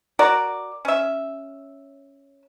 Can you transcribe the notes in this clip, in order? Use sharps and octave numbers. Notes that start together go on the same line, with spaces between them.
F#4 A#4 D5
C#4 E5